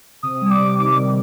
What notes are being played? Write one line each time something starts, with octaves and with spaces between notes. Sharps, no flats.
C3 D#6
G3
D6
C3
D#3 D6
C3